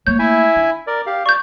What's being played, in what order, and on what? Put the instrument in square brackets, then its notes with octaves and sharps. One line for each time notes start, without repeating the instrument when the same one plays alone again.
[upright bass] A3 A#3 [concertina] C#5 [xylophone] G6
[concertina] E4 E5 G#5
[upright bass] D4
[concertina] A#4 D5
G4 F5
[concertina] D5 [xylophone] C#6 G6